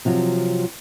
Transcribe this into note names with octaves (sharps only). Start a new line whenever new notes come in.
C3 F3 F#3